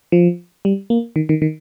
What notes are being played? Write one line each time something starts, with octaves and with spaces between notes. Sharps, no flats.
F3
G3
A#3
D#3
D#3
D#3